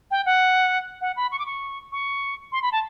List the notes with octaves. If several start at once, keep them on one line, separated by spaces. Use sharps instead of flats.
G5
F#5
F#5
B5
C#6
D6
C#6
C#6
C6
B5
A5